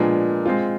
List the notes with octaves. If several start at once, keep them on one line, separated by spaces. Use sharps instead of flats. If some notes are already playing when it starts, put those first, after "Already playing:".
Already playing: A#2 F3 G#3 B3 D4
G#3 C4 F4